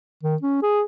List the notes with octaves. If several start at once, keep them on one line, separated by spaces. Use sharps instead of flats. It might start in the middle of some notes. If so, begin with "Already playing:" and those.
D#3
C#4
G#4